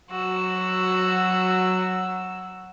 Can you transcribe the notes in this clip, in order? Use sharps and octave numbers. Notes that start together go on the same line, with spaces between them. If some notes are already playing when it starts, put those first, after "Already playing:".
F#3 F#4 E6